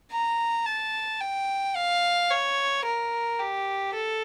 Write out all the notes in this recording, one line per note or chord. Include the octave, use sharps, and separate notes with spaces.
A#5
A5
G5
F5
C#5
A#4
G4
A4